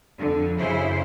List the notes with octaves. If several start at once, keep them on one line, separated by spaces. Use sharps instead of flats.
F2 D3
F#2 C#3 E4 C5